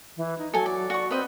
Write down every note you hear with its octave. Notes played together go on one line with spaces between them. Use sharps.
E3
D#4
F#3 A4 G#5
D5
F#4 D5 C#6
C4 B4 D#5